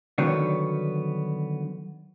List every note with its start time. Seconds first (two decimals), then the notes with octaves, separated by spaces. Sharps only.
0.18 D3 D#3 F#3 G3 B3 D4